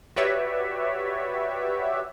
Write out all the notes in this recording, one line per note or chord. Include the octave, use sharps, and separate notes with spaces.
F#4 G4 B4 C#5 D5 E5